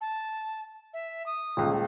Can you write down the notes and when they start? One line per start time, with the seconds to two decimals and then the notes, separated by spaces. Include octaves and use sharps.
0.01 A5
0.94 E5
1.26 D#6
1.57 D#1 C#2